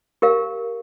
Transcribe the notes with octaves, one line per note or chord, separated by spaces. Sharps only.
G4 A#4 F5